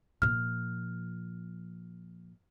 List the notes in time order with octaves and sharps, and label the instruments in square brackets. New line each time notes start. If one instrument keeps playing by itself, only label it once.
[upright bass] A#2 F3 [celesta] F6